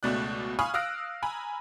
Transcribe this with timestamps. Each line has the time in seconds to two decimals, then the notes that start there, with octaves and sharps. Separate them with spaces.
0.03 C#2 B2 A3 D5 F#6
0.59 F5 G#5 B5 C#6 D#6 F6
0.74 F5 D#6 E6 F#6 A#6 D7
1.23 G#5 A#5 B5